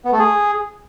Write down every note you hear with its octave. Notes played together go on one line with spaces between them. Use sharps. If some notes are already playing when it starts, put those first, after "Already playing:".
B3
A3
G#4